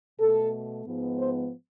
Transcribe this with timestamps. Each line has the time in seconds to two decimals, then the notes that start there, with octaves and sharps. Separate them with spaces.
0.20 B2 A3 A4
0.86 G#2 F3 G#3 B3
1.18 C5